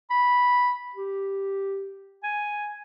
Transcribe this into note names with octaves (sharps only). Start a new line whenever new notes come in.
B5
G4
G#5